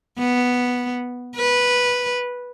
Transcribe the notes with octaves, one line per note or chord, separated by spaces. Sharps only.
B3
B4